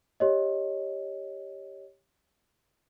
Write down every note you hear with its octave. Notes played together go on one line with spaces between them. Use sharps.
G4 C#5 D#5